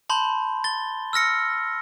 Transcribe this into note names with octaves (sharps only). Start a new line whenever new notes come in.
A5 B5 C6 G6
A6 G7
E6 F6 A#6 C#7